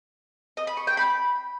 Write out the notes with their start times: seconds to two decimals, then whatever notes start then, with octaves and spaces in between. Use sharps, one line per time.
0.57 D#5
0.67 B5
0.77 C#6
0.87 G5
0.97 B5